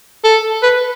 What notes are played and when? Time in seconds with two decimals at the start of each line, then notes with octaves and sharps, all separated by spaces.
0.24 A4
0.63 B4